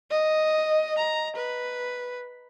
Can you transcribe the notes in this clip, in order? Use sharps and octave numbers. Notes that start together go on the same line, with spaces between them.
D#5
A#5
B4